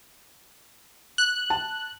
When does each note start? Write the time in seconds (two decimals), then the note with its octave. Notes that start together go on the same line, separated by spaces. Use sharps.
1.18 F#6
1.50 A5